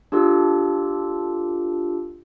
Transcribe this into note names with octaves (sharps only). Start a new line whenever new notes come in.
D4 F4 G4 A4